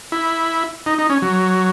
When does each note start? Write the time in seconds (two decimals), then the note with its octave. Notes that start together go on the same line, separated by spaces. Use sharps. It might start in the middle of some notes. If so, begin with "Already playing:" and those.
0.12 E4
0.86 D#4
0.99 D#4
1.10 C#4
1.22 F#3